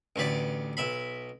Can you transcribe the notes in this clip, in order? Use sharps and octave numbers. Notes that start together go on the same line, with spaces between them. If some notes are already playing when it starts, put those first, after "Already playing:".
A1 D2 B4 D5
B1 E5 B5